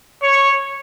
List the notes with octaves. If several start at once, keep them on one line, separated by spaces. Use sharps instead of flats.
C#5